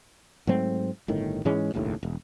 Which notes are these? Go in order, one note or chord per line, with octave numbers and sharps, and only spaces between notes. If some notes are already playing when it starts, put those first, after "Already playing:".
G#2 F#3 A3 C4
G1 A2 D#3
G#2 E3 G#3 C#4
F1 A#1 D#2 A2
E1